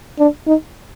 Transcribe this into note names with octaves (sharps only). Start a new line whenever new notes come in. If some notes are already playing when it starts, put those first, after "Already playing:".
D4
D#4